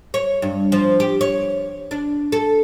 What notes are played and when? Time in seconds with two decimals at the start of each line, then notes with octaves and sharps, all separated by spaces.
0.14 C#5
0.42 G2
0.72 F3
1.00 G4
1.21 C#5
1.91 D4
2.32 A4